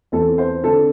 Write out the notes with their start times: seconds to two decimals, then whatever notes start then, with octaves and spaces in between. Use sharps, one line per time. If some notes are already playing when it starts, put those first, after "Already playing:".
0.12 E2 E3 C4 A4
0.38 C5
0.63 D3 C4 A4